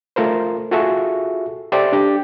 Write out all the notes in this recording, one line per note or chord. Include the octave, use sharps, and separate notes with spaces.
A3 F4 A#4 C5
F4 F#4 G#4 A4 E5 C#6
G4 A4 C5 D5 E5 G5
D4 G4